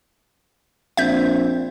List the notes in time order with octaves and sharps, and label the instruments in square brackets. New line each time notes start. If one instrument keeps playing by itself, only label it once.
[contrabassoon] A#1 [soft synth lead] C4 [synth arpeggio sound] E5 G6